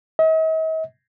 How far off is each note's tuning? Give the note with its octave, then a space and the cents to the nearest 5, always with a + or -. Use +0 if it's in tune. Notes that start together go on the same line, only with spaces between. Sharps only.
D#5 +45